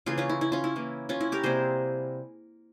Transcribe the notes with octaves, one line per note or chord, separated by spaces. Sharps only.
C#3 E3 A#3 F4 G#4
C#4 F4
E4
E4
C#4 F4
E4
E3 A#3
C#4 F4
E4
G4 A#4
C3 G3 A#3 G#4 C5